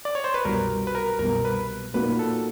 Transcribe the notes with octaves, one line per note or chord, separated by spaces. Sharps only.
D5
C#5
C5
B4
C2 B2 F#3 A#4
B4
A#4
C2 B2 F#3 A#4
B4
A#2 F#3 A#3 D#4 F#4 B4
A4